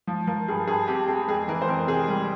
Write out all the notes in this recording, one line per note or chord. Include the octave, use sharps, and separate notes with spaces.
F3
F3 A#4
G2 G#4
G2 G#4
C4 G4
C4 G#4
F2 G#4
E3 A#4
C5
F2 A#4
C3 G#4
G3